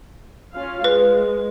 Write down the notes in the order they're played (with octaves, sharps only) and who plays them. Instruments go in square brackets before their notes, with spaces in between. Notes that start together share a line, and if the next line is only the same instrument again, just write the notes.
[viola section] C#4 F4 F5
[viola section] G#3 [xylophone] B4